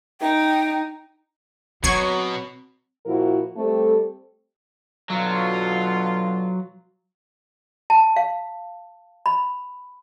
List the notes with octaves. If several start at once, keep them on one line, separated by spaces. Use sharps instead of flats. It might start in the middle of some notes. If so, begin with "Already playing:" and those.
D#4 G5
B2 F#3 C4 C#6 G#6 C7
A#2 F3 E4 F#4 A#4
G3 A3 C4 A4
B2 D3 F#3 F4
A5
F5
B5